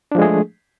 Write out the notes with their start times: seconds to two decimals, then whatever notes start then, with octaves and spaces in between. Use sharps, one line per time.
0.12 D4
0.15 F3
0.18 G#3
0.22 G#4
0.25 A3